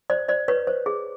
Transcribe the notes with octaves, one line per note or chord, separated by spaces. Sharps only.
C5 D5
C5 D5
B4 C#5
C5
G#4